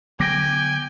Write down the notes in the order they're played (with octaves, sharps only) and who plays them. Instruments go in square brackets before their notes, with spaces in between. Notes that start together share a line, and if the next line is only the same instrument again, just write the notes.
[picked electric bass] D3 F#3 B3 [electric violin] G5 [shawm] G#5 [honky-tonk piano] D6 A#6 D7